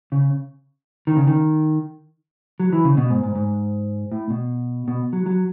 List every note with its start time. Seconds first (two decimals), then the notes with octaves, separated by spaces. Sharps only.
0.12 C#3
1.07 D#3
1.17 C#3
1.27 D#3
2.60 F#3
2.73 E3
2.85 C#3
2.97 B2
3.10 G#2
3.23 G#2
3.35 G#2
4.12 A2
4.30 B2
4.88 B2
5.13 F#3
5.26 F#3